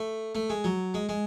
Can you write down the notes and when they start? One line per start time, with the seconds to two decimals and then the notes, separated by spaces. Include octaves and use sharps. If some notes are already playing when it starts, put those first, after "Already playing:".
Already playing: A3
0.35 A3
0.50 G#3
0.64 F#3
0.94 G#3
1.09 G#3